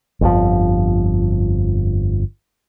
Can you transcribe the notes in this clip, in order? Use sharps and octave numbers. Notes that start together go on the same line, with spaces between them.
G1 F2 A2 F3